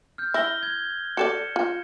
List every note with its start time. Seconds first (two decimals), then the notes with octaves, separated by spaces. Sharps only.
0.18 F6 G6
0.34 E4 E6 A#6 G7
0.63 G#6
1.17 F#4 A4 D5 C#7 E7
1.56 F4